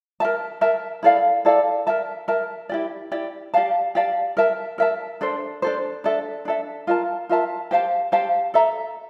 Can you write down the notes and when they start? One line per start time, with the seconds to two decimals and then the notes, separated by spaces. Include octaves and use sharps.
0.20 A#4 E5 A5
0.61 A#4 E5 A5
1.03 E4 A4 D5 F5
1.45 E4 A4 D5 F5
1.87 A#4 E5 A5
2.28 A#4 E5 A5
2.69 E4 G4 D5
3.12 E4 G4 D5
3.54 G4 D5 F5 A5
3.95 G4 D5 F5 A5
4.37 A#4 E5 A5
4.78 A#4 E5 A5
5.21 D4 A4 C5
5.62 D4 A4 C5
6.04 D4 A4 E5
6.45 D4 A4 E5
6.87 F4 A#4 E5 A5
7.29 F4 A#4 E5 A5
7.71 G4 C5 F5 A5
8.12 G4 C5 F5 A5
8.54 A4 E5 A#5